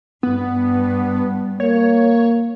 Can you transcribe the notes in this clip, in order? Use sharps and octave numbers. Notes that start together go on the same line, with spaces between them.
G2 B3
A#3 C#5